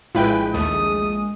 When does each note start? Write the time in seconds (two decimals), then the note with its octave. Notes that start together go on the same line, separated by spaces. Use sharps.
0.15 A#1 A2 G#3 E4 F4 B4 G5
0.54 D#2 A3 D#6